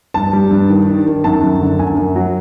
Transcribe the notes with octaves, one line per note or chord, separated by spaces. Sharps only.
G2 A5
G3
G2
D#3
D#3
D#3
F#2 A5
F#2
D3
F#2 G#5
F#2
F#3